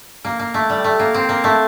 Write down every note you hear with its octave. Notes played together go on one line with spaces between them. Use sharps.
A#3
A#3
A3
G3
A3
A#3
C4
A#3
A3